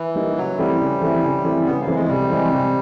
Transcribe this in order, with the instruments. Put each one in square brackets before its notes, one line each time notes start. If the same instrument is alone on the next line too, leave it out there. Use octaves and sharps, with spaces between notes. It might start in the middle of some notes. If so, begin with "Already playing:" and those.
Already playing: [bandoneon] E3
[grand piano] G3 A#3 D#4
[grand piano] C#3 [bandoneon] F#3
[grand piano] E3 A3 C4 E4 [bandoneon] G3
[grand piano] C#3
E3 A3 C4 E4
C#3
E3 A3 C4 E4
[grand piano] C#3 [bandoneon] B3
[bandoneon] A#3
[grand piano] E3 A3 C4 E4
[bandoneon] G#3
[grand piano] C3 [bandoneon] G3
[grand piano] E3 G#3 C4
C3